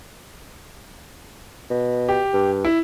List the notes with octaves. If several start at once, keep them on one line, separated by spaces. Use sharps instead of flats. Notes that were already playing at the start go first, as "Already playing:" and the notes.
B2
G4
G2
E4